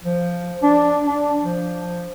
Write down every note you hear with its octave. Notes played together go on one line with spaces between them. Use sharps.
F3
D4
D4
F3